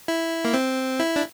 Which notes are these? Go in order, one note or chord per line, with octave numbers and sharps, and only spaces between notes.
E4
A#3
C4
E4
D4